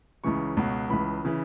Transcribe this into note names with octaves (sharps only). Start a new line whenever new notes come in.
C#2 C#3 E3 C#6
C#2 B2
C#2 C#3 E3 B5
C#3 E3